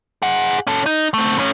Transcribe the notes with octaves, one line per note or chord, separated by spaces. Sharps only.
G#4 F#5
C#4 A4
D#4
A3 C4
A2 C#4